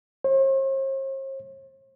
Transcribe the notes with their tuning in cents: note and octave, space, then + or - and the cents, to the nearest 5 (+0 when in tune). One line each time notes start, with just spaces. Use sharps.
C5 +45